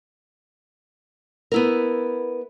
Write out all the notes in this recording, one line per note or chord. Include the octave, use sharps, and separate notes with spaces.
B3 E4 A#4